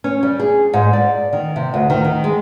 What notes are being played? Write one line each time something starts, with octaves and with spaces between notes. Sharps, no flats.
C#4
G3
G#4
G#2
D5
D#3
C3
D2
D#3
D#3
G#3